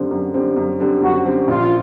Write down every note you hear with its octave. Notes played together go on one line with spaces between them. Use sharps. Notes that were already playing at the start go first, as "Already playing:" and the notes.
Already playing: F#2 D3 G3 C4
F#2
D3 G3 C4
F#2
D3 G3 C4
F#2 F#4
D3 G3 C4
A#1 F4